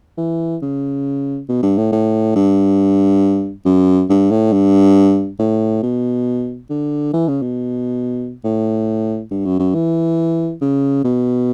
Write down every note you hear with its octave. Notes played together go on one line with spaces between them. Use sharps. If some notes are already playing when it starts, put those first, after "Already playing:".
E3
C#3
B2
G2
A2
A2
G2
F#2
G2
A2
G2
A2
B2
D3
E3
C#3
B2
A2
G2
F#2
F#2
E3
C#3
B2